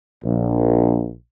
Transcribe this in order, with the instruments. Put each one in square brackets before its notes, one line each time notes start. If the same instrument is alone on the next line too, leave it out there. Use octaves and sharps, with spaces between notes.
[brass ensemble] A#1